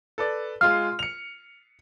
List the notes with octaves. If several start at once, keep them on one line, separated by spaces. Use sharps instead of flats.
A4 B4 D5
G#3 F4 F5 F6
C#7 F7